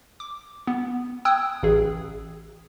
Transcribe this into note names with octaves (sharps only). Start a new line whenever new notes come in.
D6
B3
G5 D#6 E6 F#6 G#6
A1 G#4